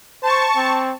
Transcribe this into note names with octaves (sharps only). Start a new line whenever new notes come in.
C5 A5 C#6
C4